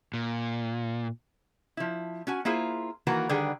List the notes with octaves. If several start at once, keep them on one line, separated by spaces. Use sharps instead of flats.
A#2
F3 E4
C#4 F#4 G#5
A#3 E4 F4 G#4 C5
D#3 E3 A#3 F#4 A#4 B4
D3 D#3 G3 G#4 B4 G5